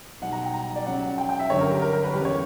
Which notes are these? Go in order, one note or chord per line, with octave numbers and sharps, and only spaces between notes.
B1 B2 G3 F#5
A#5
G5
A#5
D5
C#2 C#3 F#3 F#5
G5
G5
E5
G1 F#2 D3 F#3 C#5
A#4
G4
A#4
A#4
B4
E2 C#3 G3 G4
C#5